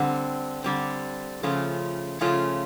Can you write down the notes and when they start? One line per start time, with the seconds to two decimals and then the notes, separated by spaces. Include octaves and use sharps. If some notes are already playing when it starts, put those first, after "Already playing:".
Already playing: D3 G3 C4
0.64 D3 G3 C4
1.43 C#3 F3 A3 C#4 F4
2.21 C#3 F3 A3 C#4 F4